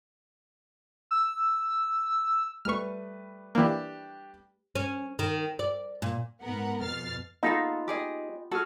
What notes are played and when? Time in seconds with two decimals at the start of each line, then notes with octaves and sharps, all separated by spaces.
1.11 E6
2.65 G3 A3 B4 C#6 F6
3.55 E3 A#3 D4 G4
4.75 C#4
5.19 D#3
5.59 D5
6.02 A#2
6.43 G#2 B3 A#4 F#5
6.83 F2 B2 F6 A6 C7
7.43 B3 D#4 F4 G#4 A4 F5
7.88 G4 G#4 D#5
8.51 F#4 G#4 A4 F6